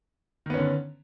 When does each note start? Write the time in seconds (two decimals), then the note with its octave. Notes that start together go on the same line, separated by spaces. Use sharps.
0.46 D#3
0.50 B3
0.54 C#4
0.58 D3